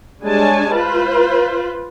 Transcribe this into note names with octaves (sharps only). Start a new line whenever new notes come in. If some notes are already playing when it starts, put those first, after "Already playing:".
G3 G#3 D4 C#5 G#5 A5
F4 B4 C5